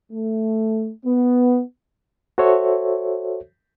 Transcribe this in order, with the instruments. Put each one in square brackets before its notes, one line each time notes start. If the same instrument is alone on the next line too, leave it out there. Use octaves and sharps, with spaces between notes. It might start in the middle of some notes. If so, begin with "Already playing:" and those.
[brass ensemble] A3
B3
[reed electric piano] F#4 A4 C5 C#5 E5